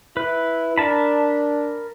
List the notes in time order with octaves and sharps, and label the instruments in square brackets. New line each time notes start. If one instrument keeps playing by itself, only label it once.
[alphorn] E4 [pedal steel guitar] B4
[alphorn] D4 [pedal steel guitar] A#4 A5 B5